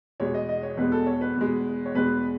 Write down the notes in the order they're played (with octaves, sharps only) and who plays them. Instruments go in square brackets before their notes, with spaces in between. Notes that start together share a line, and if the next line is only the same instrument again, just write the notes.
[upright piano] E2 B2 G#3 C#5
D#5
D#5
C#5
E2 B2 G#3 B4
A4
C#5
B4
E2 B2 G#3
C#5
E2 B2 G#3 B4